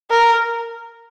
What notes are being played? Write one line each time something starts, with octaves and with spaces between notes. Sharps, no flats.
A#4